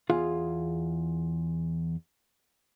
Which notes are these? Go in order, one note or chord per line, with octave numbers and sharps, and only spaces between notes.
E2 F4 G#4 F5